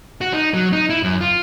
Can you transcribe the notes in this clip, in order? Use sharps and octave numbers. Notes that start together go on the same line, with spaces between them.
F#4
D#4
F#3
D#4
E4
F#2
F4